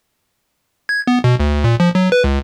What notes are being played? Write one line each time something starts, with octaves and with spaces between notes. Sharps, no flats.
G#6
B3
B2
D2
A#2
F3
F#3
B4
C#2